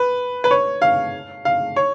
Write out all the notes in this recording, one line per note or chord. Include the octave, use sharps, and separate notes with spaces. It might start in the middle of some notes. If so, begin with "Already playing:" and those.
Already playing: B4
B4
C#5
F5
F5
C#5